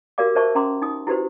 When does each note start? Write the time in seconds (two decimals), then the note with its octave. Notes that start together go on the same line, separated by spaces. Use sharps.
0.18 F#4 G4 A#4 D5 F5 D6
0.35 A#4 C5 D5 E5 A5 C#6
0.55 C#4 A#5 C6 D6
0.82 D#4 D#6
1.07 E4 F#4 G4 B4 C5